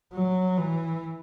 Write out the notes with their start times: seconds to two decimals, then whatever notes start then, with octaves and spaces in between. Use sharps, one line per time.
0.13 F#3
0.58 E3